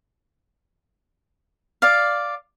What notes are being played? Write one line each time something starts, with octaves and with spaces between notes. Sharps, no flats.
D5 F5